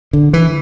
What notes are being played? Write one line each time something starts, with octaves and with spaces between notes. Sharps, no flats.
D3
E3